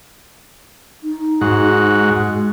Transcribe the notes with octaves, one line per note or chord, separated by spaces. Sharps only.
D#4
G#2 F#4
G#3